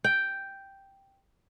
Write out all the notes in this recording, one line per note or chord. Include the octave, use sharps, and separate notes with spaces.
G5